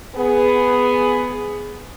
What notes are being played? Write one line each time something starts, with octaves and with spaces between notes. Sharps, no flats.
B3 G#4